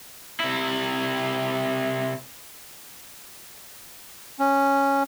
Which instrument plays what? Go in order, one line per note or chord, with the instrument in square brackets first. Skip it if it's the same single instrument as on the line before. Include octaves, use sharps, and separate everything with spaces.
[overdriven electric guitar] C3 E4
[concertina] C#4